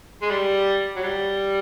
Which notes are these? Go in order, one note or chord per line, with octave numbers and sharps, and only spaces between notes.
G#3
G3
F#3
G3